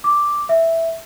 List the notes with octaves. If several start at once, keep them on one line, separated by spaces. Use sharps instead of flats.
D6
E5